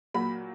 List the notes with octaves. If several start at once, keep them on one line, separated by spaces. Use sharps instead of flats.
A#2 F#3 A#3 B5